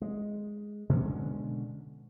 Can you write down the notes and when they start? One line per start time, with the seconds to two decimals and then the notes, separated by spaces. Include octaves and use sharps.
0.02 G#3
0.89 B2 D3 G#3 C#4